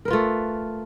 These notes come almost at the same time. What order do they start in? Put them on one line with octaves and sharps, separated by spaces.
A#4 B4 F4 A3